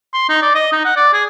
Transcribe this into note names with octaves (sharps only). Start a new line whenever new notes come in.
C6
D#4
D5
D#5
D#4
F#5
D5
G#4